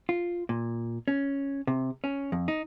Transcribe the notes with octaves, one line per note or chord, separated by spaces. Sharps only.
F4
A#2
C#4
C3
C#4
F2
D#4